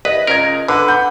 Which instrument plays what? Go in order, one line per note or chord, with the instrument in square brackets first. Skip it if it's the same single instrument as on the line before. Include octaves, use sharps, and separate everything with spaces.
[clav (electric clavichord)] C2 B4 [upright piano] D#5
[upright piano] C#2 D#5 G#6 [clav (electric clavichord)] A#4
[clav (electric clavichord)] D3 [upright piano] B4
[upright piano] F#5 B5 G6